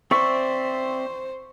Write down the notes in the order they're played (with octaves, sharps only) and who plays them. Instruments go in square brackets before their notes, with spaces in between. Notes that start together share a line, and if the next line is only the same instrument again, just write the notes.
[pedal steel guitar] C4 D5 E5 [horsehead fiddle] C5 [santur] C#6